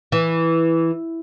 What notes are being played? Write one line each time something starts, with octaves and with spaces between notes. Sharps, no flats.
E3